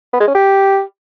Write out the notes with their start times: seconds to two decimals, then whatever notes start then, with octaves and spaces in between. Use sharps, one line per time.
0.13 B3
0.20 G#3
0.27 C#4
0.35 G4